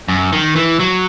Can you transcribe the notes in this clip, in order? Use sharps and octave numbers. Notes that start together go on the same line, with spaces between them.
F#2
D#3
E3
F#3